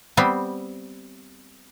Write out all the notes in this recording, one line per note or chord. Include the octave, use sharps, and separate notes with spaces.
G3 B3 C4